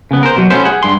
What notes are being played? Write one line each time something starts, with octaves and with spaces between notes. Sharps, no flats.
C#3 B3
A#4 C5
B2 F#3
A3 B3 C#4 C5
G#4 F#5
G2 C6